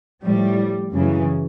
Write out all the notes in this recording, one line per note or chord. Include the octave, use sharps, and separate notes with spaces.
A2 F3 G3
F#2 C#3 E3